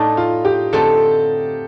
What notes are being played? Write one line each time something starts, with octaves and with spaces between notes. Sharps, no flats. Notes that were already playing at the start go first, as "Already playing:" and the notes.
Already playing: A2 A3 D4 D#4
F4
G4
D3 A3 C4 D#4 A4